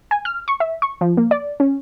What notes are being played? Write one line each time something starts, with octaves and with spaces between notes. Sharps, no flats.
G#5
F6
C#6
E5
C#6
F3
A#3
D5
C#4